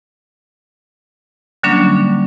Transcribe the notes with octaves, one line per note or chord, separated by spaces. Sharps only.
D3 F#3 G3 A#3 C#4 D4